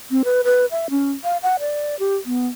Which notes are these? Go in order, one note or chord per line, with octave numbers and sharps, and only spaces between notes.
C4
B4
B4
E5
C#4
F5
F#5
D5
G4
B3